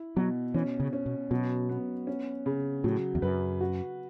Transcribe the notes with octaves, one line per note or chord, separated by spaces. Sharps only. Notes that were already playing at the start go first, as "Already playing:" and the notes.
Already playing: E4
B2 F#3
E3 C#4
C#3
C#4
B2
B2 F#3
B3
C#4
C#3
A2 F#3
E2
F#2 B4
F#4